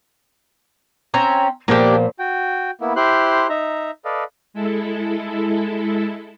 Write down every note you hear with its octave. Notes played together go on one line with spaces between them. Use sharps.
C4 C#4 A#5
A#2 F3 A#3 B3 D4 G4
F#4 G5
A#3 B3 E4
E4 G4 C5 C6 F#6
D#4 E5 A#5
A4 B4 D5 D#5 F5
G#3 E4 A4